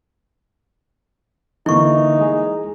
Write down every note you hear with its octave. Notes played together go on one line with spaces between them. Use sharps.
D3 E3 A#3 D#4 E4 C#6
G#3 G#4